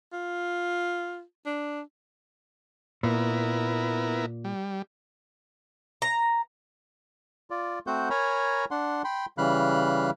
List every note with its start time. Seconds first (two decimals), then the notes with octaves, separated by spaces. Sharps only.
0.13 F4
1.46 D4
3.03 A#2 B3 E4 A#4
4.44 G3
6.02 A#5
7.50 F4 D5
7.87 A3 C4 F#4 C5 F#5 G6
8.10 A#4 C#5 G#5 A#5 B5
8.71 D4 F#5 C6
9.04 G5 B5 C6
9.38 C#3 E3 G3 F5 B5 F#6